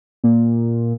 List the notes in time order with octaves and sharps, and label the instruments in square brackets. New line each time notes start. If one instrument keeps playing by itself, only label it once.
[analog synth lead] A#2